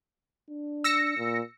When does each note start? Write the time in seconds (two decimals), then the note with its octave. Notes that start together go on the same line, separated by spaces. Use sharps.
0.50 D4
0.84 E6 A#6 C#7
1.17 A#2